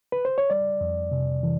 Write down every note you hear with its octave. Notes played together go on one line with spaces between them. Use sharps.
B4
C5
C#5
G3 D5
F2
C3
E3